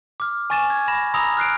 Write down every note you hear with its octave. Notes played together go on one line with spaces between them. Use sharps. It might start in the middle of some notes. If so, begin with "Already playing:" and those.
D6 F6
G#5 C#6 A6 D#7 E7
G#6
B5 A#6 E7
A#5 B5 D#6 E6 A#6 F7
F6 F#6 C7 D7